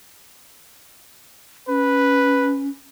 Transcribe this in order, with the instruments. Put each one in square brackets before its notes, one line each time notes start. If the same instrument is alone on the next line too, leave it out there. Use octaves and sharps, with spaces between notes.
[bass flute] C#4 [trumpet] B4